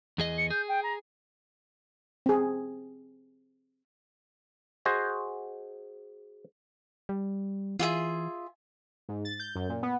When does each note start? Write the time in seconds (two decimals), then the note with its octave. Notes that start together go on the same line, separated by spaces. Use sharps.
0.18 E2 G#4 D#5
0.38 C#7
0.50 G#4 G6
0.68 G5
0.83 A#5
2.26 C4 G#4
4.85 F#4 G#4 C5 D#5
7.09 G3
7.79 E3 F4 G#4 E5
9.09 G#2
9.25 A6
9.40 G6
9.55 F#2
9.69 A#2
9.83 B3